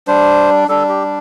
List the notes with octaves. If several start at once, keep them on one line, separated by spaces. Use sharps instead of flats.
G3 D4 C5
G3 D4 A4
G4